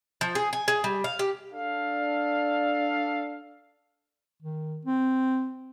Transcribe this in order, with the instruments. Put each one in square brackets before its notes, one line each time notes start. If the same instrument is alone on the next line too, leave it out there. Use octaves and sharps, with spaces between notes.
[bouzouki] F3
G#4
G#5
G#4
G3
F5
G4
[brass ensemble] D4 A4 F5
[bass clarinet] D#3
C4